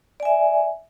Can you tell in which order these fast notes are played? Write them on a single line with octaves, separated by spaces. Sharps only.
D5 G#5 E5